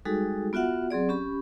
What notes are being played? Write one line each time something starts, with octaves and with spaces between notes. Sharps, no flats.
G3 G#3 D#4 F#4 G#4 A4
B3 F4 F#4 E5 F#5
F#3 C4 G#4 D5
C#4 G4 B5